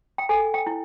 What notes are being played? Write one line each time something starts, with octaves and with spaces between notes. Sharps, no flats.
G5
A4 G#5
G5
E4